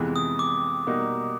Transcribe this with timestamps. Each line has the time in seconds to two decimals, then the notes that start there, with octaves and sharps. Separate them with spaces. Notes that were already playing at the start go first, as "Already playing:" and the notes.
Already playing: F2 C3 E3 G#3 B3
0.16 D#6
0.39 D6
0.87 B2 G3 A#3 D#4